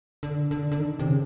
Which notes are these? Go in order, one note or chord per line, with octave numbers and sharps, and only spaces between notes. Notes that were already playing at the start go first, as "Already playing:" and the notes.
D3
D3
D3
D#3
C3
C#3